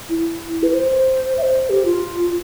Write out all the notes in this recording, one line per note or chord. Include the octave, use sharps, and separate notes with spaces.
E4
B4
C5
E5
C5
G4
F4